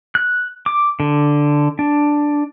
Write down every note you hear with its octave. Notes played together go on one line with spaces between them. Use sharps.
F#6
D6
D3
D4